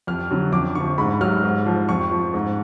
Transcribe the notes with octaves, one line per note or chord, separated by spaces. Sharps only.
F2 F6
D3 F#3
F2 D6
D3 F3 C#6
G#2 B5
F#3 F6
G#2
F3
F2 C#6
F3
G#2